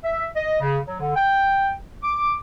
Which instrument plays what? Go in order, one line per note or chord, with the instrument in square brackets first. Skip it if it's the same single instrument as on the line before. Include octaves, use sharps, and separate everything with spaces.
[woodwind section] E5
D#5
C#3
F#3
D3
G5
D6